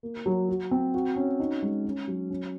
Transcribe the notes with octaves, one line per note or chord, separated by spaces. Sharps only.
A#3
F#3
F#4
C4
F#4
C#4
D#4
G#3
C#4
F#3
C#4